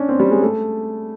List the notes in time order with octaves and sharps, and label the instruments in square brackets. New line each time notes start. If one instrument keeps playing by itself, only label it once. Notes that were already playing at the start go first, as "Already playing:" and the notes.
Already playing: [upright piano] C#4 D4
C4
G3
G#3
A3